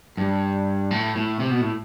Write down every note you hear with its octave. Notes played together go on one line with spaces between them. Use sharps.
G2
A2
A2
C3
B2
A2